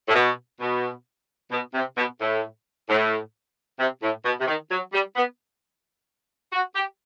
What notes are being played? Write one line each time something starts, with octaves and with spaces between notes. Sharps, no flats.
A2
B2
B2
B2
C3
B2
A2
A2
C3
A2
B2
C3
D#3
F#3
G3
B3
F#4
G4